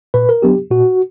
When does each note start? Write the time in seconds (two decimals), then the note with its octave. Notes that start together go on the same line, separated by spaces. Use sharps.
0.14 A#2 B4
0.29 A#4
0.42 F#3 B3 D4 G4
0.71 A#2 F#4